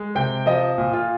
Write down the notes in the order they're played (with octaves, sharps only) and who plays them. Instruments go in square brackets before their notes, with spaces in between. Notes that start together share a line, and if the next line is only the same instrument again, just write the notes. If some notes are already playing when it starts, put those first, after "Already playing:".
Already playing: [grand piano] G#3
[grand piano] C3 [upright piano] G5
[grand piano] F3 [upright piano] D#5
[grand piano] A#2
[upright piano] F4